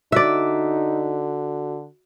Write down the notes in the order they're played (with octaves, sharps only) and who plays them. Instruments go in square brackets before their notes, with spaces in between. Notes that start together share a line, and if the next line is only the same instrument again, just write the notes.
[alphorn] D3 [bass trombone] D#4 [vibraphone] F#4 [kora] D5 E5